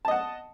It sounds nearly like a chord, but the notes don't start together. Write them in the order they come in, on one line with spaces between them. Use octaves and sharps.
A5 D#5 F#5